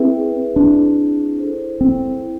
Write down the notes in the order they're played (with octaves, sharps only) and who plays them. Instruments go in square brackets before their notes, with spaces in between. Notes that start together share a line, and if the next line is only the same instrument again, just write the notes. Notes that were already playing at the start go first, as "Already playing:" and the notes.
Already playing: [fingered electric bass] C4 [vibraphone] E4 G#4 B4 E5
[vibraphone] C4 E4 G#4 [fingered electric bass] D4
[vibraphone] E4 A4 C5
[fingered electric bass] C4
[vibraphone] E4